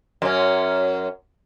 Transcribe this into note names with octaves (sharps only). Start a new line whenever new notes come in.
F#2 C#4